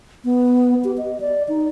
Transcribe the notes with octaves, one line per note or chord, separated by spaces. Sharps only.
B3
G4
D#5
D5
D#4